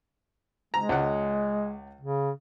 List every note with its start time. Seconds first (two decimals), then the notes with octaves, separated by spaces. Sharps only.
0.74 G#3 A#5
0.89 C#2 F#5
2.00 C#3